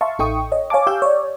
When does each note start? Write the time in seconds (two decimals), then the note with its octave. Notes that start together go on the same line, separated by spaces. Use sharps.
0.01 E5 F5 A5 C6 C#6
0.19 A1 D#4 A4 G5 C#6 D#6
0.52 C#5 D#5
0.70 C#5 F5 G#5 A5 D6
0.87 G4 F5 D6 E6 G6
1.02 C#5 D5